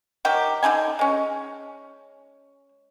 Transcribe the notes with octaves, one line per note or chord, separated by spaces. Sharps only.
D#3 F#3 G4
D3 D#4 A4 G#5
G#3 C#4